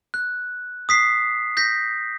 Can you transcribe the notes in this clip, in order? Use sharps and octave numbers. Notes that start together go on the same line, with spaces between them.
F#6
D#6 B6 C7
G6 A#6 B6